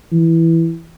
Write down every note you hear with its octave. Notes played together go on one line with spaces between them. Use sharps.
E3